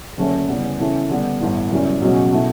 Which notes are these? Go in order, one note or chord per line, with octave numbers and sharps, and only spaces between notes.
F#1 F#2 D3 A3 C#4
E2 C#3 G3 B3
C#3 E3 A3 C#4
D3 G3 B3
A1 G2 E3 B3
F#2 C#3 E3 G3 C#4
C#2 B2 F#3 C#4
B2 A3 E4